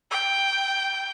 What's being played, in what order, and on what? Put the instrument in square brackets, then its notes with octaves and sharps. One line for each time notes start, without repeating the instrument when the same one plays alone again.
[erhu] G5